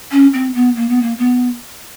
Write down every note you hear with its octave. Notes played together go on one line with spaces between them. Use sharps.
C#4
C4
B3
A#3
B3
A#3
B3